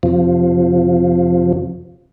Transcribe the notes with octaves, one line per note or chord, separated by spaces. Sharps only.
F2 C3 F3